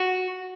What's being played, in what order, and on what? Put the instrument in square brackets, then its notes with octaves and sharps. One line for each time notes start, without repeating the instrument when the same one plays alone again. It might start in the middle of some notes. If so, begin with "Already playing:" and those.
Already playing: [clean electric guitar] F#4